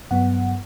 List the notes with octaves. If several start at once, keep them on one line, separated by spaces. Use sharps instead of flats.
G2 F#3 B3 F#5